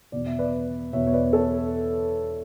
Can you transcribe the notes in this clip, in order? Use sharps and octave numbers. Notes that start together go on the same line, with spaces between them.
E2 B2 D5
E5
B4 D5
E2 B2 C#5 E5
C#5
B4 D5
A4 C#5